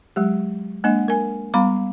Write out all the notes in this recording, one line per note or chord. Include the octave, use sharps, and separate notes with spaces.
F#3 G#3 G4
G#3 A#3 D4 D#5 F#5
A#4 G#5
G3 B3 F5 B5 D6